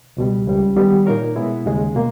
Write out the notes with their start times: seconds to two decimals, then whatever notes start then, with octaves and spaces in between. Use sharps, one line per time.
0.17 C#2 B2 G3
0.46 C#2 C#3 G3
0.76 D#3 G3 B3
1.06 A#2 A#3 D#4 A#4 C#5
1.36 B2 G#3 B3 E4
1.66 D#2 C#3 G#3
1.95 B2 A#3